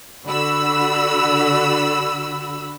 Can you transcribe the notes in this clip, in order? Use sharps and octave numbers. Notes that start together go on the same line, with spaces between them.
D3 F#4 B5 E6